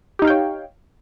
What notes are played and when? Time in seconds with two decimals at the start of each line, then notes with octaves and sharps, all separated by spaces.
0.19 G4
0.22 D#4
0.25 F5
0.27 G5
0.30 C#5